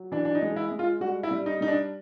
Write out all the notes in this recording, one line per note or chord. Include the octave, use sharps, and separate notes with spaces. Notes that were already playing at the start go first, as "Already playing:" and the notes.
Already playing: F#3
E3 D4
D4
D#4
G#3
E4
G#3
F4
G3 F#4
E4
G3
D#4
G3 D#4
D4